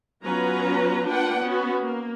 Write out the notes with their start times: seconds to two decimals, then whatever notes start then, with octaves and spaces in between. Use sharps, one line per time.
0.23 F#3 B3 C#4 F4 B4 A#5
1.06 A#3 D4 F4 B4 F#5 G5
1.42 B3 C#4 F#4
1.81 A#3